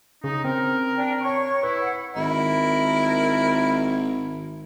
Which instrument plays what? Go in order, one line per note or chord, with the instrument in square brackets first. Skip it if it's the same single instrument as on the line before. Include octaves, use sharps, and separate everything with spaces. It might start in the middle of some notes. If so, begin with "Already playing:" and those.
[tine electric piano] C#3 [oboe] D#4
[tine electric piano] C4 [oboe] A#4
[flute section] D4 G5
C#5 C#6
[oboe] E4 [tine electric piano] B4
[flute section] F#5
[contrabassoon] G#1 [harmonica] E4 A#4